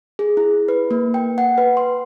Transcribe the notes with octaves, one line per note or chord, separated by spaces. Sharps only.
G#4
E4
B4
A#3
G5
F#5
B4
C6